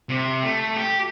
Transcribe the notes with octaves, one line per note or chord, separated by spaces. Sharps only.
C3
A3
G4